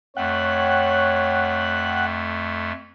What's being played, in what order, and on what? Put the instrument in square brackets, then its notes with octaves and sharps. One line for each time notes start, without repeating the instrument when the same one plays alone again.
[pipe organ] F2 A3 [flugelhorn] C#5 [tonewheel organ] F#5 G5 F#6